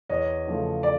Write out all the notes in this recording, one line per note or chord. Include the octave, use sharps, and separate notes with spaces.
E2 C#5 D#5
C#3 F3 A3
D5